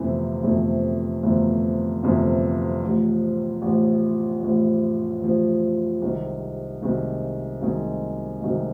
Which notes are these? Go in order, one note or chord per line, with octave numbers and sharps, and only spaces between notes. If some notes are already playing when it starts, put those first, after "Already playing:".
Already playing: G1 F2 C3 E3 A3
G1 F2 C3 E3 A3
G1 F2 C3 E3 A3
G1 F2 C3 E3 A3
A1 A2 F3
A1 A2 F3
A1 A2 F3
A1 A2 F3
C2 C3 D#3 G#3
C2 C3 D#3 G#3
C2 C3 D#3 G#3
C2 C3 D#3 G#3